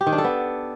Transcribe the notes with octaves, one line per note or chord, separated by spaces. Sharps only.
G4
D#3
D4
A4
B3